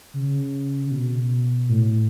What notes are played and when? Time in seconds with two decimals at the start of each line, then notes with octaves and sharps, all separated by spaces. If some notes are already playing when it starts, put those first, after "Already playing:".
0.14 C#3
0.86 C#3
0.91 B2
1.69 A2